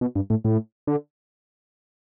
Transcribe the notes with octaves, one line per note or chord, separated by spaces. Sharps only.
B2
G2
A2
A2
D3